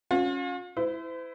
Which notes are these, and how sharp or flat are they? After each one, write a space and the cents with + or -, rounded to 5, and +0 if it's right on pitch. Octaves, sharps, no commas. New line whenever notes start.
C#4 +0 F4 +40
E4 +0 C5 -40